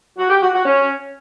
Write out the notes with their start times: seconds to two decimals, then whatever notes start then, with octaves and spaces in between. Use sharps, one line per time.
0.18 F#4
0.30 G4
0.42 F#4
0.54 F#4
0.65 C#4